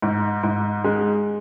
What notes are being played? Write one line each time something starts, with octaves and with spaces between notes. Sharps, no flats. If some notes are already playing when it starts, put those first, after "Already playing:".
G#2
G#2
G#3